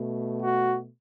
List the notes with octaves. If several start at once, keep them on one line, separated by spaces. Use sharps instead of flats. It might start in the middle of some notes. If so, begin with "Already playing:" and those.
Already playing: B2 A3
F#4